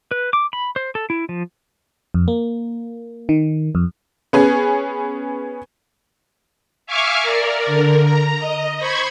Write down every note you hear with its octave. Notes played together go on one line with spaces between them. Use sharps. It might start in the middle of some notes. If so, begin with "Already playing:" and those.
B4
D6
B5
C5
A4
E4
F3
F2
A#3
D#3
F2
B3 C#4 G#4
E5 F5 G#5 C#6 D6 F6
A#4 D5
D3 A#4
A#5
D#5
C5 B5 C#6 G#6